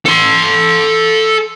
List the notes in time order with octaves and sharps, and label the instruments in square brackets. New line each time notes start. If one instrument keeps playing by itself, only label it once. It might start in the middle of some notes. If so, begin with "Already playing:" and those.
[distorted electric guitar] A4 C6